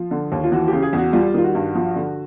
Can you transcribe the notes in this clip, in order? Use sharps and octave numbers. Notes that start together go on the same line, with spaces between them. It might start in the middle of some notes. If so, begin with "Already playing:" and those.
Already playing: F3 F4
D3
D#2
F4
E3 F#4
G4
C#3
G#4
E2
F#4
G3 F4
D#3 F4
F#4
G2
F3
D3